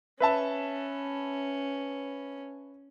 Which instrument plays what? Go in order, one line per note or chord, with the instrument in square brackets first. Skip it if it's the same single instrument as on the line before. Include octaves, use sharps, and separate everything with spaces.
[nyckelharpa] C#4 [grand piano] B4 E5 A5